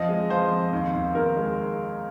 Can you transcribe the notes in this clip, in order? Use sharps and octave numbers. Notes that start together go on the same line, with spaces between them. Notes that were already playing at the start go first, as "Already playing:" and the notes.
Already playing: F2 F3 D#5
G#3
F3 C5
F2
D#2
D#2
D#2 A#4
G#3